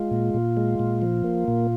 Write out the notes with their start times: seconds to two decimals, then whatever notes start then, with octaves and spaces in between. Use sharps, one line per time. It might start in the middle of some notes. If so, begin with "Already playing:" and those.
Already playing: G#3 F4
0.11 A#2
0.34 A#2
0.57 G#3
0.79 A#2
1.02 F3
1.24 A#3
1.48 A#2